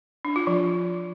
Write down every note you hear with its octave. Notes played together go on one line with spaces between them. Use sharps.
D4
F4
F3